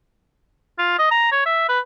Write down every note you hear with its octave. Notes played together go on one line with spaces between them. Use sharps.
F4
D#5
A#5
C#5
E5
B4